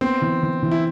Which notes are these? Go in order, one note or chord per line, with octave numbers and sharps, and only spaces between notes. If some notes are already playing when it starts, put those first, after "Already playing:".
B3 C4
E3
E3
E3
E4